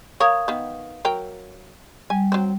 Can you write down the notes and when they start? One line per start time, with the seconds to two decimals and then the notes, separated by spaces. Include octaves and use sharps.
0.20 A#4 C#5 F5 D#6 G#6
0.48 D#3 B3
1.05 F#3 A#4 G5
2.10 G3 G#5
2.32 F#3 C4